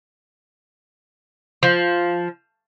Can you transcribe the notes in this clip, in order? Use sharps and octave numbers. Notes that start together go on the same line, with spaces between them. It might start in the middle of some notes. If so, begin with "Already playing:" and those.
F3